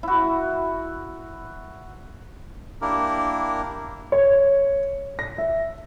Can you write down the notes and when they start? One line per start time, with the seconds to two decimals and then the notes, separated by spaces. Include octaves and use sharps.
0.03 E4 F#4
2.82 A#3 D4 E4 G4 A#4
4.12 C#5
5.19 A#6
5.38 E5